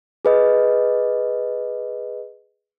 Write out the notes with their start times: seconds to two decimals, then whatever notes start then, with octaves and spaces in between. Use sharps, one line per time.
0.25 G#4 B4 D#5